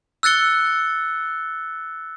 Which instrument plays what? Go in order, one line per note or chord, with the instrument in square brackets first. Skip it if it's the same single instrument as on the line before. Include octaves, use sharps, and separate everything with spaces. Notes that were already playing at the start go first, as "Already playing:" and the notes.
[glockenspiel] E6 F#6 A6 C#7 G7